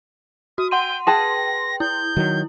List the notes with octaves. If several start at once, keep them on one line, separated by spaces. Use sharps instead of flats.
F#4 D#6
F#5 G5 C6 D#7
G#4 B4 G5 A5 C6 A#6
E4 G6
D#3 F#3